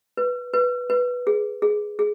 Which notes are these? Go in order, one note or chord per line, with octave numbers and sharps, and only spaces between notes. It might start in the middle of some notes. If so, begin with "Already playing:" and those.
B4
B4
B4
G#4
G#4
G#4